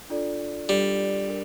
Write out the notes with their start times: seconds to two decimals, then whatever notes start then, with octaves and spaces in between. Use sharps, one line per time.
0.09 D4 F4 A4 D5
0.69 G3 D4 F4 A4 D5
1.28 D4 G4 A#4